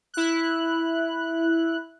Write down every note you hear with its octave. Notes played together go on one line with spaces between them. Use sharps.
E4 F#6